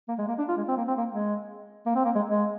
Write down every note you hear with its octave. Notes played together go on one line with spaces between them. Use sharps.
A#3
G#3
A#3
D4
F4
G#3
C4
A#3
C4
A#3
G#3
A#3
C4
A#3
G#3
G#3